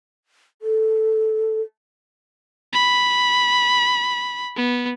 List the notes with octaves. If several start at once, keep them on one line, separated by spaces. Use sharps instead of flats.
A4
B5
B3